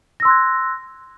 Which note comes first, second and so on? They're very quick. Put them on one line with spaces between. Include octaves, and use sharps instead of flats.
A#6 E6 C6 F#6 G#6